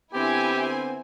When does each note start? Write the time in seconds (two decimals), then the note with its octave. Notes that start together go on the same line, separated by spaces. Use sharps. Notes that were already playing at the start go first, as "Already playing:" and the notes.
0.14 D3 B3 C4 E4 G4 G#5